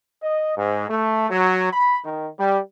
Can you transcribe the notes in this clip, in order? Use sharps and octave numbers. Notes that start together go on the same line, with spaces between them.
D#5
G#2
A3
F#3
B5
D#3
G3